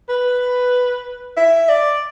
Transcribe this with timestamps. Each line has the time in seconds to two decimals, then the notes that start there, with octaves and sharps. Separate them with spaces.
0.09 B4
1.37 E5
1.69 D5